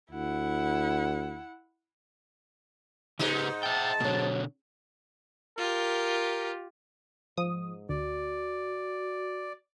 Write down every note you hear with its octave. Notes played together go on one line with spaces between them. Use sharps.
D2 E4 F#5
G#2 C#3 D#4 G4 B4
E5 G5 A5
B2 D3 F#3 C4
F4 G4 A#4
G#2 F3 D#6
D2 F#4 D5